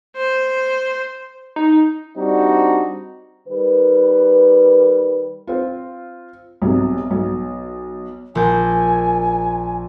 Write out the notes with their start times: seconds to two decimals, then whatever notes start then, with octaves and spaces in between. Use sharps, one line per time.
0.17 C5
1.56 D#4
2.16 G3 C4 D4 D#4 F#4
3.48 D#3 G3 A#4 B4
5.47 C4 F4
6.62 B1 C3
7.11 B1
8.35 A#1 G#5 G6